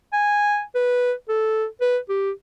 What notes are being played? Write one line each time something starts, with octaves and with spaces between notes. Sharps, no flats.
G#5
B4
A4
B4
G4